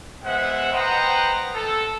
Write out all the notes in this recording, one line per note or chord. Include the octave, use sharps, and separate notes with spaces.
G#3 B3 C5 E5 F#5
B4 C5 D#5 F#5 G5 A#5
A4